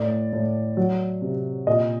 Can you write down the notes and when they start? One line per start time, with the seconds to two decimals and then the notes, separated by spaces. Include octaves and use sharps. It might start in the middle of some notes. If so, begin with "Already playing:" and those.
Already playing: A2 D5
0.33 A2
0.77 F#3
1.22 C3
1.67 A#2 D#5